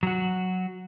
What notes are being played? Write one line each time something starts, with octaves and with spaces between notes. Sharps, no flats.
F#3 F#4